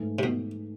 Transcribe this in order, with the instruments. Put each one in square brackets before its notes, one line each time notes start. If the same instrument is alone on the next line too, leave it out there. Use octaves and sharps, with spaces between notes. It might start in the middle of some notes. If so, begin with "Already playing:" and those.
Already playing: [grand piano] G#2 E3 A3
[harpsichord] C3
B2